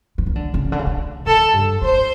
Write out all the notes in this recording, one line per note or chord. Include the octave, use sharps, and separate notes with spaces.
E3
D#3
D3
C#3
D3
C#3
D3
C#3 A4
G2
G2 C5